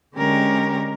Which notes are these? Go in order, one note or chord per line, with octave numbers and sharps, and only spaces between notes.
D3 G#3 C#4 G4 A#4